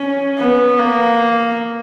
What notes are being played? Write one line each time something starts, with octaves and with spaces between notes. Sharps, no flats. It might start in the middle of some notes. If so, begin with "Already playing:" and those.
Already playing: C#4
B3
A#3